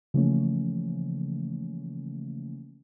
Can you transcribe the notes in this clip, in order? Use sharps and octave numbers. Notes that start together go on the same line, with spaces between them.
C#3 E3 F3 A3 A#3 C#4